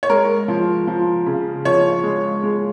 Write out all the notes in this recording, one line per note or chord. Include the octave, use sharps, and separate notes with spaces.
C#5
G#3 A#4
F3
F3
C#3
F3 C#5
G#3
G#3